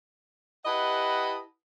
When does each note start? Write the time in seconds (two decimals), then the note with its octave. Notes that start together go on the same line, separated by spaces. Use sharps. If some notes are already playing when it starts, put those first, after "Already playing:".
0.65 E4 G4 B4 D#5 F#5 A5